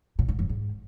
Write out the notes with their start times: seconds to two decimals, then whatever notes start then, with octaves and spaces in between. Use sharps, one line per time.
0.19 A#2
0.28 G#2
0.39 F#2
0.49 G#2